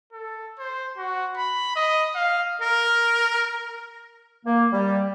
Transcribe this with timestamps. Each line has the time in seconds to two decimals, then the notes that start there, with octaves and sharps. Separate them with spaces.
0.13 A4
0.59 C5
0.97 F#4
1.37 B5
1.76 D#5
2.15 F5
2.61 A#4
4.46 A#3
4.73 G3